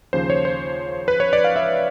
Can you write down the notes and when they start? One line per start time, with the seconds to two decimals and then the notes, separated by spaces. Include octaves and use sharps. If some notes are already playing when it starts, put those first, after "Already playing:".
0.13 D#2 C#3 F3 C5
0.30 C#5
0.45 C5
1.08 B4
1.20 C#5
1.33 D5
1.44 F5
1.56 E5